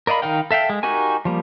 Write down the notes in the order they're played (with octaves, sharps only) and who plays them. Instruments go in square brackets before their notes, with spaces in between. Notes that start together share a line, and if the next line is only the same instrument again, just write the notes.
[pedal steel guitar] A#4 D5 D#5 F5 B5
D#3 D#4 A#4 F5 G5
A4 E5 F5 G5
G#3
D#4 F#4 G4 A#4 G#5
F3 G3 A#3